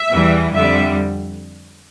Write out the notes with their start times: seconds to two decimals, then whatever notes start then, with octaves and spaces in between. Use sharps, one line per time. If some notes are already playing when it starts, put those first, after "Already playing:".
Already playing: E5
0.11 E2 E3 G3
0.52 F2 D3 G3 E5